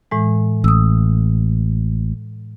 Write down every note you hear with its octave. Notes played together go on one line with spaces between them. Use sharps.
A2 E3 G#3
A1 D#6 E6